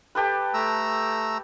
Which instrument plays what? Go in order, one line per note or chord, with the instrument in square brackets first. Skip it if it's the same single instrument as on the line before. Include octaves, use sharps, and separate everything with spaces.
[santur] G4 A4 B4
[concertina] A3 A#5 E6